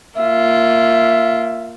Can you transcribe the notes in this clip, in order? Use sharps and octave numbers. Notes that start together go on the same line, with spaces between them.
A#3 F4 E5